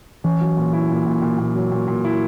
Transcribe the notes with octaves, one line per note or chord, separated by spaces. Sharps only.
E3 C#4
F#3
A#2
E4
A#2
A#2
A#2
A#2
F#3
A#2
A#2
E4